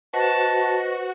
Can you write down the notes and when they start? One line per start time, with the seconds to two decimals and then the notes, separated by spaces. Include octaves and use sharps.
0.14 F#4 B4 C5 D#5 A5